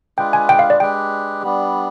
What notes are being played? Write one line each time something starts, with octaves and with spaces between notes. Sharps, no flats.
G#3 D4 F4 B4 G5
G#5
G5
F5
D5
G#3 D4 G4 B4 G5
G3 B3 D4